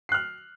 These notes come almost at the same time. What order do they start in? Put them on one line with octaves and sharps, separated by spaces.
C7 F#6 F6